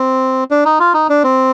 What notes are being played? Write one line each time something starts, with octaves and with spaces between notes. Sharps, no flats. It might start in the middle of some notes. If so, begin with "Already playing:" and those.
Already playing: C4
D4
D#4
F4
D#4
D4
C4